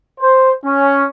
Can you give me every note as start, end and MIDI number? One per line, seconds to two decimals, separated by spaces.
0.21 0.51 72
0.64 1.03 61